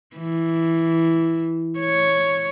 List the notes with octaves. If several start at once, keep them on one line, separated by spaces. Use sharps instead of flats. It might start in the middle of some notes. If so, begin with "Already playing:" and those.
E3
C#5